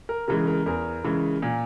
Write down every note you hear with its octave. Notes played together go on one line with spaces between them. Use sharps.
A#4
C#3 E3 G#3 A#4
A#4
E2 A#4
C#3 E3 G#3
A#2